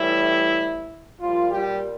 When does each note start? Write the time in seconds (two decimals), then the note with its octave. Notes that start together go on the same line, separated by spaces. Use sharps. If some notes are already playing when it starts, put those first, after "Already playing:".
Already playing: A2 E3 G3 E4
1.20 A#2 F3 G3 F4
1.51 G3 G4